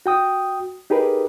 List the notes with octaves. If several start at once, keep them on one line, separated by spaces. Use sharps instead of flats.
F#4 G5 D#6
D#4 G4 G#4 A#4 B4